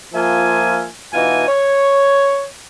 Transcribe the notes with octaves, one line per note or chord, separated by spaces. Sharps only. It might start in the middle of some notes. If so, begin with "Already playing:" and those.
F3 A#3 F4 E5 G#5
B2 E3 D#4 F4 F#4 G#5
C#5